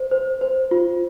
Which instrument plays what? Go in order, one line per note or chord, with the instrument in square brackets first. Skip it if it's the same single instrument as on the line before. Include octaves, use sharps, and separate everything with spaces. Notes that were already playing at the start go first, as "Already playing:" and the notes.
Already playing: [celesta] C5
C5
C5
F4